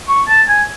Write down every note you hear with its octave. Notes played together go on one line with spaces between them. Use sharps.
C#6
A5
G#5